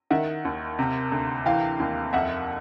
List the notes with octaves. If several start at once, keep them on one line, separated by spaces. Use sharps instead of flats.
D#3 E5 F#5
D#2
C3
D2
E3 F5 G5
D#2
F2 E5 F#5